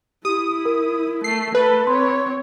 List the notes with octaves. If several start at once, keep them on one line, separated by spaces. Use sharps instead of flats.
E4 G4 D#6
A#4
A3 C7
A3 A4 B4
C4 C#5 C6